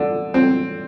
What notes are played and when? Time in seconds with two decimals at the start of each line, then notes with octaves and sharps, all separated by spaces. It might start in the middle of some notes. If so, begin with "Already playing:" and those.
Already playing: D3
0.34 C4